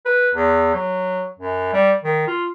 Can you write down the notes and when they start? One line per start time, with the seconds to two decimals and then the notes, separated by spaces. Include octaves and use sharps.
0.06 B4
0.35 E2
0.74 F#3
1.39 F#2
1.73 G3
2.04 D#3
2.27 F4